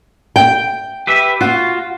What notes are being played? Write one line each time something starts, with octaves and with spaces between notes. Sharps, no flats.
G5
G4 B4 E5
F4 F#4